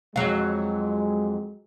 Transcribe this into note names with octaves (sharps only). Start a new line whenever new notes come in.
F2 F#3 G#3 F5